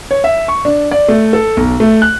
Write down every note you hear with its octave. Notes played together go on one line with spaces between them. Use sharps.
C#5
E5
C#6
D4
D5
A3
A4
B1
A3
F#6